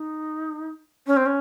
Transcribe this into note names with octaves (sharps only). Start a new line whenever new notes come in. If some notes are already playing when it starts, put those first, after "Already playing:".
Already playing: D#4
C#4
C4
C#4